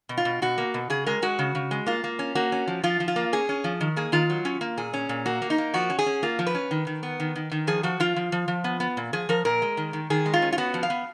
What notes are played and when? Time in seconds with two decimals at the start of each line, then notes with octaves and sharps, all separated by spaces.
0.09 B2
0.17 F4
0.25 B2
0.42 B2 F#4
0.58 A#3
0.74 B2
0.90 C#3 G#4
1.06 G#3 A#4
1.22 G#3 F#4
1.39 C#3
1.55 C#3
1.71 G#3
1.86 A#3 F4
2.04 A#3
2.19 C#4
2.35 A#3 F#4
2.52 C#4
2.68 F3
2.83 F3 F4
3.00 F3
3.08 F4
3.16 A#3
3.33 C#4 G#4
3.49 C#4
3.64 F3
3.81 D#3
3.96 A#3 G#4
4.12 D#3 F4
4.30 F#3
4.45 C#4
4.61 A#3
4.77 A#2 G#4
4.94 C#4
5.09 A#2
5.26 A#3 F#4
5.42 A#3
5.50 D#4
5.58 A#3
5.74 F3 F#4
5.90 C#4
5.99 G#4
6.06 C#4
6.23 A#3 F4
6.39 F3
6.47 B4
6.55 C#4
6.71 D#3
6.87 D#3
7.03 B3
7.20 D#3
7.35 D#3
7.51 D#3
7.67 F3 G#4
7.83 F3 F#4
8.00 F3 F4
8.16 F3
8.32 F3
8.48 F3
8.64 B3
8.80 B3
8.97 A#2
9.13 F3 G#4
9.29 F3 A#4
9.45 A#2 A#4
9.62 G#3
9.77 D#3
9.93 D#3
10.10 D#3 G#4
10.26 G#3
10.34 F4
10.42 C#4
10.53 F4
10.58 B3 F#4
10.74 F3
10.83 F5
10.90 B3